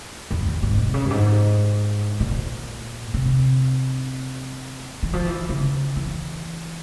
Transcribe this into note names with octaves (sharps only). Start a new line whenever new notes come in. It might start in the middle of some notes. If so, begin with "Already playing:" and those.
E2
E2
G#2
C3
C#3
G2
G#2
A#2
C3
E3
F3
E3
C#3
E3